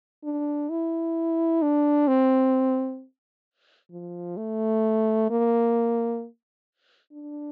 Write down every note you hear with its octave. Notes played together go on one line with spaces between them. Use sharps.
D4
E4
D4
C4
F3
A3
A#3
D4